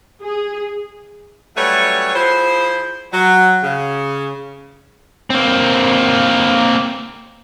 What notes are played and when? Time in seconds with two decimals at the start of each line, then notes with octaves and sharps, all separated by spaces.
0.22 G#4
1.56 F#3 G3 A3 C#4 B4 C#5
2.14 F3 E4 G#4 C5
3.12 F#3
3.63 C#3
5.30 A#3 C4